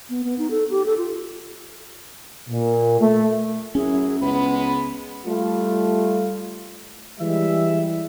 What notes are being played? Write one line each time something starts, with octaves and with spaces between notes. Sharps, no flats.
B3
B3
D#4
A4
G4
A4
F4
A#2
A3
F#2 F#3 C#4 E4 G#4
C#2 G#3 B3 B5
G3 A3 F4
E3 G3 G#3 E5